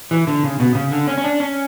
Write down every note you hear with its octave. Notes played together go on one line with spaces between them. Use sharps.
E3
D3
C#3
B2
C#3
D3
C#4
C#4
D4
C#4